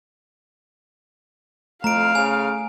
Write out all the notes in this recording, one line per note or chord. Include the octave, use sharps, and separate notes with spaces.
F2 A3 F5 A#5 D7
C#3 G#5